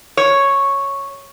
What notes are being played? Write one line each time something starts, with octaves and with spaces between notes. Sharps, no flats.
C#5